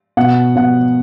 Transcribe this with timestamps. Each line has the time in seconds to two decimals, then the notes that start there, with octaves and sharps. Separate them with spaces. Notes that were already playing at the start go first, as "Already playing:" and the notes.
0.17 B2 F#5
0.56 B2 F#5